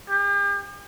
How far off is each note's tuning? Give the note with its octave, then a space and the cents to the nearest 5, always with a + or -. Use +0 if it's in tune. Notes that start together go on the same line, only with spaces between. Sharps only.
G4 +40